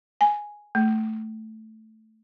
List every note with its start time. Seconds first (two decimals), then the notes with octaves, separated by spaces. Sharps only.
0.21 G#5
0.75 A3